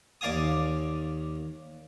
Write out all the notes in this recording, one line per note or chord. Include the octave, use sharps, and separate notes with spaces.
D#2 D5 F5 G#5 D#6